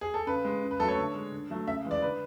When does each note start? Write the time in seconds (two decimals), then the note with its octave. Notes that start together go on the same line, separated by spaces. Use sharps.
0.01 G#4
0.14 A4
0.27 C#3 B4
0.45 G#3
0.62 C#3
0.71 B4
0.80 F#3 A3 A4
0.88 C#5
0.98 D3
1.15 G#3
1.32 D3
1.50 F#3 A3
1.67 C#3 E5
1.84 E3 G#3
1.91 D5
2.02 D3 B4